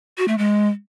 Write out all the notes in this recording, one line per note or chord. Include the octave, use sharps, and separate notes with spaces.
F#4
A3
G#3